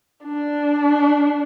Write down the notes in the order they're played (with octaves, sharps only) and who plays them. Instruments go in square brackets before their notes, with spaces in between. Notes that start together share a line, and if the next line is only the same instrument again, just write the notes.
[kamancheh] D4